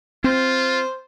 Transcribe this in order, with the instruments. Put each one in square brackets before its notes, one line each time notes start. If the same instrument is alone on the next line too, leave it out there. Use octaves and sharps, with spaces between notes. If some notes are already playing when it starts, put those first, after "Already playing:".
[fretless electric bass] C4 [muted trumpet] F4 [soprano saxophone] C5